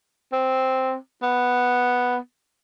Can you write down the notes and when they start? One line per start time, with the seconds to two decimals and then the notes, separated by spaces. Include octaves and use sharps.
0.33 C4
1.22 B3